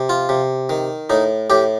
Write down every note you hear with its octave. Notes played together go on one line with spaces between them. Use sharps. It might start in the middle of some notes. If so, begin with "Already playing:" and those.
Already playing: C3
F4
C3
D#3
A2 D#4
A2 G4